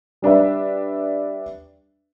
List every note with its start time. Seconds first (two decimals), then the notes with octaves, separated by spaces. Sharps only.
0.22 G3 D4 B4 E5